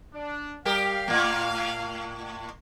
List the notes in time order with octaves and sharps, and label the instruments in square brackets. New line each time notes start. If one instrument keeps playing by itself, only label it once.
[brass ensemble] D4
[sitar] G3 G4 A#4 [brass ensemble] F5
[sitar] A2 A#3